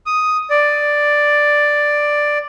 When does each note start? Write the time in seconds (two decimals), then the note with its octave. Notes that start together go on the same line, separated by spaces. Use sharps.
0.06 D#6
0.50 D5